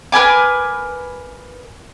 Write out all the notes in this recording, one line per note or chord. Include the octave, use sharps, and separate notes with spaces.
A#4 B4 G#5 D6